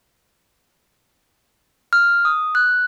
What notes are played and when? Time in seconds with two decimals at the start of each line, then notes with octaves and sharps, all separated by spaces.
1.93 F6
2.25 D#6
2.55 F#6